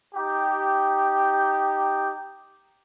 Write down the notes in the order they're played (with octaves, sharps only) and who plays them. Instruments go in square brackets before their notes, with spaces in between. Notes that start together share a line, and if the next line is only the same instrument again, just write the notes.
[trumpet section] D#4 G4